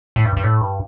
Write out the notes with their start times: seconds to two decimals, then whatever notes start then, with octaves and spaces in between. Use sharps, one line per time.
0.16 A2
0.25 G2
0.37 G2
0.44 A2
0.61 G2